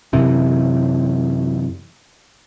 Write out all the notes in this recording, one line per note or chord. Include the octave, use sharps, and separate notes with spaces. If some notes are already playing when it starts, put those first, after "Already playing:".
F#2 C3 E3